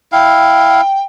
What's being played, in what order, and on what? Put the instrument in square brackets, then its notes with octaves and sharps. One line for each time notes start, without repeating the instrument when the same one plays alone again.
[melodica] E4 F5 [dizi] G5